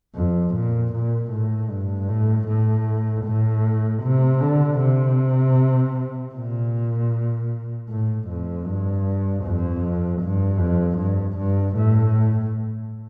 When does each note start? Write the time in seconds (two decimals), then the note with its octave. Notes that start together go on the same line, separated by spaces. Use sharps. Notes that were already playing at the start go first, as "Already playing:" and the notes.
0.15 F2
0.54 A#2
0.93 A#2
1.32 A2
1.70 G2
2.08 A2
2.48 A2
3.25 A2
4.03 C3
4.41 D3
4.80 C3
6.35 A#2
7.89 A2
8.29 F2
8.67 G2
9.44 F2
10.22 G2
10.60 F2
10.99 G2
11.38 G2
11.77 A2